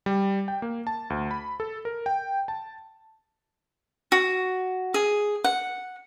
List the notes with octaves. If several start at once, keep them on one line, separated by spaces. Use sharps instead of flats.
G3
G5
A#3
A5
D2
B5
A4
A#4
G5
A5
F#4
G#4
F#5